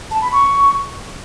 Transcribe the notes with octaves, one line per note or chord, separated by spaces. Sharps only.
A5
B5
C#6